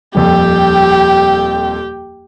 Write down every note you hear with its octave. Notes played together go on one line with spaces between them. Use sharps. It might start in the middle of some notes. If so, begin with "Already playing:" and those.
D#1 F2 G4 G5